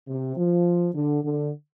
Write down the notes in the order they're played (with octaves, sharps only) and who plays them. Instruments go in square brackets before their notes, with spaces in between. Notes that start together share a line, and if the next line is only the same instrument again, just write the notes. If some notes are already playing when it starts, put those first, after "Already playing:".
[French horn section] C3
F3
D3
D3